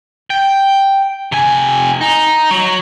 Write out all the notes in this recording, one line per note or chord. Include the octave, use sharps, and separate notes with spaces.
G5
C3 G#5
D#4
F#3